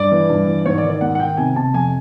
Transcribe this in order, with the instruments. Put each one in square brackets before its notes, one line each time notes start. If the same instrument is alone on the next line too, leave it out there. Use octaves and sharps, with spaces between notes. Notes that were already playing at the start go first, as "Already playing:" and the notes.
Already playing: [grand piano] G2 D5
E3
G2
E3
G#2 C#5
D5
D#3
D5
G#2 F#5
F#5
D#3 G5
C3 G#5
C3 A5
F2 G#5